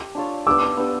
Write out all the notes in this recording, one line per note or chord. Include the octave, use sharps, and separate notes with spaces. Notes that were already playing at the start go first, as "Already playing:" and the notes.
Already playing: G4
D4 F4 A4 C#5
B3 D4 G4 D6 E6
B3 D4 G4